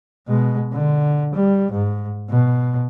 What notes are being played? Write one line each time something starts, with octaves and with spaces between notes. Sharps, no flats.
B2 G#3
D3
G3
G#2
B2